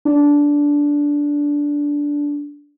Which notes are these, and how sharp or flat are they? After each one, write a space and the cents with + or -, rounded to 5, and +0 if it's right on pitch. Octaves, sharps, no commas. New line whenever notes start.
D4 -15